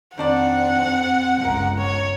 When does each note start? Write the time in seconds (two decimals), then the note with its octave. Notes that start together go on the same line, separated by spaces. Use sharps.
0.18 F2 D#3 C4 D4 D5 F#5
1.41 G1 C#2 F3 A#4
1.79 C#5